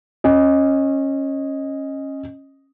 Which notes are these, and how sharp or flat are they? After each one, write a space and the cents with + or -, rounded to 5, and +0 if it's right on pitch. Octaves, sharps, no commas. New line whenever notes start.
C#4 -20 D#5 +0